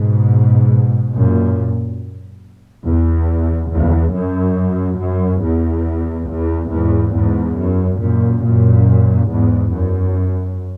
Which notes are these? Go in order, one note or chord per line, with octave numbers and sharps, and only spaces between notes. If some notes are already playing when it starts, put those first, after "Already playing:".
Already playing: G#2 B2
F#2 A#2
E2
E2
F#2
F#2
E2
E2
E2 G#2
E2 G#2
F#2
F#2 A#2
F#2 A#2
E2 G#2
F#2